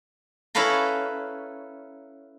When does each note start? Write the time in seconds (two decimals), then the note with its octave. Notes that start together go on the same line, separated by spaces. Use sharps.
0.55 C#4 E4 A4 B4 F5 A#5